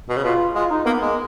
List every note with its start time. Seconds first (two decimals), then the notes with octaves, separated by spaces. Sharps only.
0.09 B2
0.17 C#3
0.24 B2 F4
0.55 G#3 F4
0.70 D#4
0.86 A#3 B3
1.01 G#3 A#3